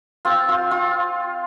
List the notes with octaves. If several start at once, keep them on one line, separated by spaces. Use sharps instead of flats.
C4 F4
F4
F4